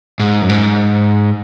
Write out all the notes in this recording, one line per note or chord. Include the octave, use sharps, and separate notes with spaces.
G#2
F#2
G#2